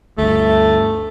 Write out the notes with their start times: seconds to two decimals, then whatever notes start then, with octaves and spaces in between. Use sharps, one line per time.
0.18 D2 G2 A3